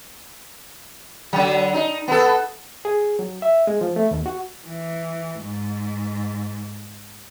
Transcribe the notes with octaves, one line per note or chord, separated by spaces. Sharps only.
D3 F#3
D#4
B3 A4
G#4
F#3
E5
G#3
F3
A3
D#2
F#4
E3
G#2